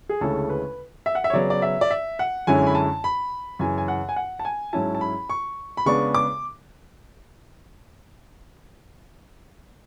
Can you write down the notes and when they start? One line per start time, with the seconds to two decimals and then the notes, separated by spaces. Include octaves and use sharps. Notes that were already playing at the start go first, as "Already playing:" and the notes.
0.09 G#4
0.21 D2 C#3 G#3 C#4 E4 A4
0.50 B4
1.06 E5
1.15 F#5
1.24 E5
1.30 C#5
1.33 C#3 F#3 B3 D5
1.50 D5
1.62 E5
1.81 D5
1.91 E5
2.19 F#5
2.47 F#2 D3 G#3 C#4 E4 G#5
2.67 B5
2.75 A5
3.04 B5
3.59 F#2 C#3 E3 G#5
3.78 G#5
3.88 F#5
4.09 G#5
4.16 F#5
4.39 A5
4.45 G#5
4.73 G#2 F#3 C#4 E4 A5
4.95 A5
5.01 B5
5.30 C#6
5.77 B5
5.86 C#3 G#3 B3 D4 C#6
6.15 D6